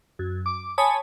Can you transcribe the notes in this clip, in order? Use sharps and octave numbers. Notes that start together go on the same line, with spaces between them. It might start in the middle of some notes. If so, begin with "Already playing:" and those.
F#2
D6
C#5 G#5 A5 B5 D#6